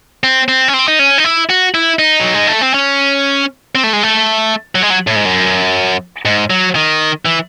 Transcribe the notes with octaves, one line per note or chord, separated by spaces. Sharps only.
C4
C4
C#4
C4
D#4
C#4
D#4
E4
F#4
E4
D#4
F#3
G#3
A3
C4
C#4
C4
A3
G#3
A3
F#3
G#3
F#3
A2
G#2
F#2
G#2
F#3
D#3
E3